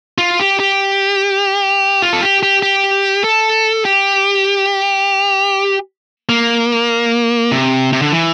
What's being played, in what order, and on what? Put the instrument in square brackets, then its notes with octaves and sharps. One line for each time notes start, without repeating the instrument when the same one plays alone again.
[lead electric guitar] F4
G4
G4
F4
A4
G4
G4
G4
A4
G4
A#3
C3
C3
D3
E3